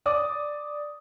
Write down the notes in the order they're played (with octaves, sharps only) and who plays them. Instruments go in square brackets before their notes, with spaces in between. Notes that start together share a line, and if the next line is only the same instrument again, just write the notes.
[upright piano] D5 D6 D#6